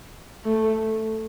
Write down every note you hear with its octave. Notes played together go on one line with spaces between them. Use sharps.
A3